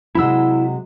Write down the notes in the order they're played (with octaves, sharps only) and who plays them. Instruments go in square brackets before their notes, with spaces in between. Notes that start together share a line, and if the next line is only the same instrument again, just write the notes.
[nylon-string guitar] C3 F#3 G#3 [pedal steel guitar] E4 E6